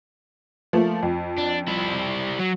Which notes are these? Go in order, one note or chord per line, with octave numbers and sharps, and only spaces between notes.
F3 A3 A#3
F2
D4
G3 E4
F#3